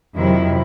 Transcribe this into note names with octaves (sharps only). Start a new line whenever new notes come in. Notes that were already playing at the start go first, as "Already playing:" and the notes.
F2 C3 D#3 F#3 E4